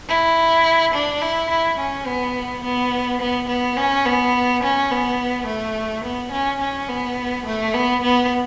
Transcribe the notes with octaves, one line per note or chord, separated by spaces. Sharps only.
E4
D4
E4
E4
C#4
B3
B3
B3
B3
C#4
B3
C#4
B3
A3
B3
C#4
C#4
B3
A3
B3
B3